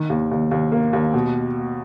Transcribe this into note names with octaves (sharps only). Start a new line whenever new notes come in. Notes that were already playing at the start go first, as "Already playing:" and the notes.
Already playing: D#3
D#2
D#2
D#2
A#3
D#2
B2